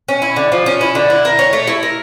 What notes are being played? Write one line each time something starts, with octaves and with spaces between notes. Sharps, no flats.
C#4
E4
D3
F3
C#4
E4
D3
E4
A#4
C#5
A3
E4
A#4